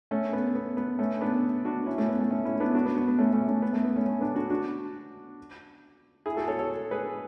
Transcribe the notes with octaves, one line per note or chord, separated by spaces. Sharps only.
A3 C#4
B3
B3
B3
A3 C#4
B3 D4
D4 F#4
C#4 E4
A3 C#4
B3
A3
A3 C#4
C#4 E4
E4
B3 D4
D4 F#4
B3
B3
B3
A3 C#4
A3 C#4
A3 C#4
B3
A3
B3
A3 C#4
A3 C#4
B3 D4
D4 F#4
D4 F#4
E4 G#4
F#4 A4
A4 C#5
A4 C#5
G#4 B4